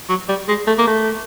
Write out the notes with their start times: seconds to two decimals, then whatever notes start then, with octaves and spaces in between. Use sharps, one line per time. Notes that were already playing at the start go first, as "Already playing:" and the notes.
0.09 F#3
0.29 G3
0.48 G#3
0.67 A3
0.78 A#3
0.87 A3